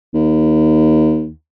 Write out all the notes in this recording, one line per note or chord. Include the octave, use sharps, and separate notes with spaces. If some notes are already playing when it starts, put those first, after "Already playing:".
D#2